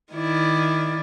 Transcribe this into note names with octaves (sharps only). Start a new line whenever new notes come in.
D#3 E4 D5